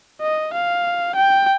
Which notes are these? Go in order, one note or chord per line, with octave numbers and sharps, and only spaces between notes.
D#5
F5
G5